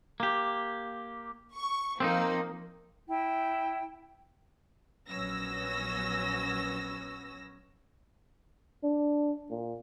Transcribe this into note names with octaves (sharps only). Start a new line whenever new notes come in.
A#3 G4
C#6
F3 A#3 C4 D4 D#4
E4 G5
A#1 F#3 B3 C#4 E6 A#6
D4
A#2